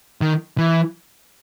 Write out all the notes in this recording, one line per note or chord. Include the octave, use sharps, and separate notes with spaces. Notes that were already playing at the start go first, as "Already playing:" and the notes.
D#3
E3